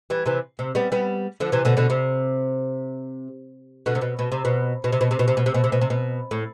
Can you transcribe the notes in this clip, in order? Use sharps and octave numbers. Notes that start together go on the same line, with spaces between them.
E3 G3
C3 E3
C3
G3 B3
G3 B3
D3 F3
C3 E3
B2 D3
B2 D3
C3
B2 D3
C3
B2
B2
C3
B2
B2
C3
B2
C3
B2
C3
B2
C3
B2
C3
B2
C3
B2
A2